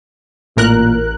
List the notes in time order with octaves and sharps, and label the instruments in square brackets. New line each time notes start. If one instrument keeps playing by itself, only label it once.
[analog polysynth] A1 A#4 F#6 [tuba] A#2